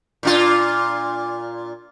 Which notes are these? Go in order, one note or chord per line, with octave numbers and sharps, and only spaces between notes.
A#2 D4 F4